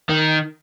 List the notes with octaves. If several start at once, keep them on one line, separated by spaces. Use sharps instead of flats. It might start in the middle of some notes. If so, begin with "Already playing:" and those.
D#3